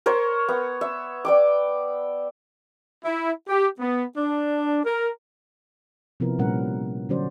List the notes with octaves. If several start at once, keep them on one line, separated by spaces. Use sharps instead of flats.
A#4 C5 C#5
B3
E5
D5 G5 D6
E4
G4
B3
D4
A#4
C3 F3 B3 E4 A#4
A#2 G3 C#4 A#4 F#5
D3 F#3 C#4 F#4 C5 D5